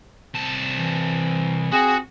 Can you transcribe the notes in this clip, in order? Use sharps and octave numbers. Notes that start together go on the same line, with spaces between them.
C2 A5
E3
C4 F#4 G#4